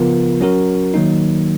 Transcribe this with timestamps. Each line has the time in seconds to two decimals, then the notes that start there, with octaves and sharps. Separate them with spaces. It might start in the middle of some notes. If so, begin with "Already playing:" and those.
Already playing: C#3 F3 B3 F4 A#4
0.41 F#3 C#4 F#4 A#4
0.94 D#3 F#3 A#3 D#4